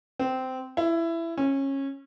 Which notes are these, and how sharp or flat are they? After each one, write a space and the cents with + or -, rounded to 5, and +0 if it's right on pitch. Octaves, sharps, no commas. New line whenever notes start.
C4 -15
E4 +15
C#4 -20